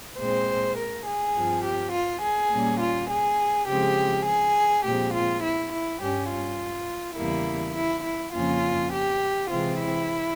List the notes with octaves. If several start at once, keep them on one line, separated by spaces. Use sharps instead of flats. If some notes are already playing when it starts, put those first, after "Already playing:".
A#2 G#3 C4 C5
A#4
G#4
G2 F3 C4
G4
F4
G#4
A#2 G3 A#3 C#4
F4
G#4
C#3 F3 G#3 C4 G4
G#4
A#2 F3 G#3 C4 G4
F4
E4
E4
G2 G3 C#4 G4
F4
E2 C#3 G3 A#3 E4
E4
E4
F2 C#3 F3 A#3 C#4 F4
G4
C3 E3 G#3 C4 F4
E4